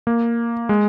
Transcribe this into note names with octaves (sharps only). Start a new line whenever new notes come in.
A#3
G#3